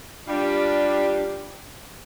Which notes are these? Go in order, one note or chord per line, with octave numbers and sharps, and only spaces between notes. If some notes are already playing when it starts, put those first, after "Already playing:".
G3 D4 F4 G4